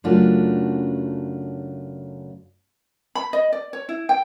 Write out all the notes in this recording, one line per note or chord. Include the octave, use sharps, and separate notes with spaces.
F#2 C#3 A3 D4 F4 F#4
B5
D#5
D5
C#5
E4
G5